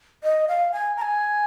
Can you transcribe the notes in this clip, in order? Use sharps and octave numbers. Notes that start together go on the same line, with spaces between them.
D#5
F5
G#5
A#5
G#5